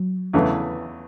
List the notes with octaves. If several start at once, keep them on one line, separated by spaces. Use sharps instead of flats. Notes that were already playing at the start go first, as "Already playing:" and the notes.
Already playing: F#3
E2 C#3 E3 A3